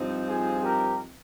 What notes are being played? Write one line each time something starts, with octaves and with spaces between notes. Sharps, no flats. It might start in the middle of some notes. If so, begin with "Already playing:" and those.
Already playing: G2 F3 C4 D#4
F4 G#4
G4 A#4